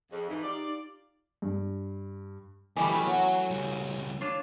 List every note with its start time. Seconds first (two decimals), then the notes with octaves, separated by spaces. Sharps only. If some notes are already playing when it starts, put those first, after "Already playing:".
0.11 F2 G#4
0.30 G#2 E3 D#4
0.43 F4 G4 D5
1.42 G2
2.76 D2 E3 G3 A3 A4 D#5 G#5
2.92 F#3 A3 C#4
3.06 F#4 C#5 F#5
3.50 C#2 G3
4.21 D4 F4 C#5